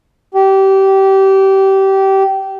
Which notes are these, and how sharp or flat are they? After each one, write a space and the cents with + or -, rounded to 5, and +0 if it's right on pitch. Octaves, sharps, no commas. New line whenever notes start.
G4 -20